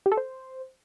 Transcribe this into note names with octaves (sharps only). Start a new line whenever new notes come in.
G4
A4
C5